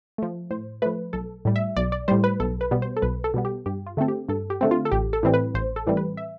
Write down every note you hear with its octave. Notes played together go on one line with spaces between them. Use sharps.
F3 A3
A2 C5
F3 A3 B4
B1 A4
A2 G3
E5
B1 D5
D5
A2 G3 C5
B4
B1 A4
B4
B2 G3 B3
C5
A4
B1 B4
A4
B2 G3 B3
G4
G2 G4
F4
D3 A3 C4 A4
G4
G2 A4
G4
D3 A3 C4
F4
A4
A1 G4
A4
A2 E3 G3 C4
B4
A1 C5
A4
A2 E3 G3 C4
B4
E5